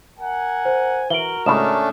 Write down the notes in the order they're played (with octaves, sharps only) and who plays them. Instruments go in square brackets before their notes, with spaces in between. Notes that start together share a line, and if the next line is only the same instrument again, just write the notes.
[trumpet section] A#4 F#5 G#5
[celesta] C5
[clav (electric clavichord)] E3 [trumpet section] F#4 A#4 [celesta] D7 F#7 G7
[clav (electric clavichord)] C#2 A2 C#3 [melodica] A3 C#4 D4 [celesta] D#6 E7